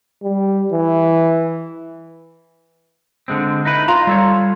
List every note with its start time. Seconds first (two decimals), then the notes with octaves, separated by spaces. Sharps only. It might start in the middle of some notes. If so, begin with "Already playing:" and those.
0.23 G3
0.72 E3
3.28 D3 G#3 C4
3.65 D#4 E4 B4
3.88 F4 A#5
4.07 G3 A4 C#5